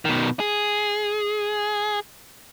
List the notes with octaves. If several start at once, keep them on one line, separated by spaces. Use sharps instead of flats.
B2 D#3
G#4